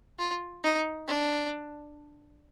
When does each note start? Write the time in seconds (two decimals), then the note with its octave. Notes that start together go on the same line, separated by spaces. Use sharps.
0.19 F4
0.64 D#4
1.08 D4